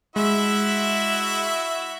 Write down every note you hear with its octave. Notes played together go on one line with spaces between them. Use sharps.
G#3 E4 F#4 E5